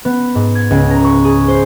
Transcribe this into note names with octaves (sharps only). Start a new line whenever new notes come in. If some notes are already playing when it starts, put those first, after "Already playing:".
B3
G#2
G#6
C#2
A#5
C#6
G#4
C5